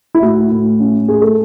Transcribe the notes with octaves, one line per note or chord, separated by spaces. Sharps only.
E4
A2 F#4
A2
C#4
A2 G#4
A4